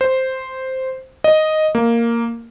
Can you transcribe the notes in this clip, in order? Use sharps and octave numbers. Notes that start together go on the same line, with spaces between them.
C5
D#5
A#3